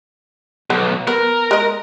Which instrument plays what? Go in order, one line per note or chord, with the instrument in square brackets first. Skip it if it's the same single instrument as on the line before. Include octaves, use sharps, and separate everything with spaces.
[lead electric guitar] B1 [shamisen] B3
[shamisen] B3 B4 [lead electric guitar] A#4
[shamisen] G#3 D#5